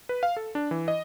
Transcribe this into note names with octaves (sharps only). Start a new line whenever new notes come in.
B4
F5
A4
D4
E3
D#5